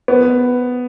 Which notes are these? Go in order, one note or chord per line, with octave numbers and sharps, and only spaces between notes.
B3